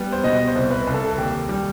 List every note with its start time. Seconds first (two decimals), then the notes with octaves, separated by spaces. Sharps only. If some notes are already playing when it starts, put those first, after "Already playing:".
Already playing: G3 B3
0.12 C5
0.24 B2 D#5
0.47 C5
0.55 C2
0.70 B4
0.87 C2
0.94 A4
1.18 D#2 G4
1.49 G3